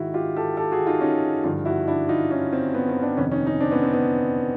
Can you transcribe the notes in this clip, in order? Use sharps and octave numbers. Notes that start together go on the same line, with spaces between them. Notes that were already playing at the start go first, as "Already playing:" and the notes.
Already playing: G#2 D#3 E4 F#4
F4 G4
G4 A4
G4 A4
F#4 G#4
D#4 F4
C#4 D#4
G2 D3 F3 D#4 F4
E4 F#4
D4 E4
D#4 F4
C#4 D#4
C4
B3
C4
C4 D4
F2 C3 D#3 B3 C#4
C#4 D#4
C#4 D#4
C4 D4
B3 C#4
C4
B3